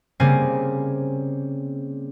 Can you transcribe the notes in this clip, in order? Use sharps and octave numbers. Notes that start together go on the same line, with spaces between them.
C#3 G3 A#3 C4 G#5